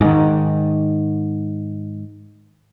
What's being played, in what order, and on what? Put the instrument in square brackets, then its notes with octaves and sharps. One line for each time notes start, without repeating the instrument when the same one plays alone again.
[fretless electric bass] G#2 D#3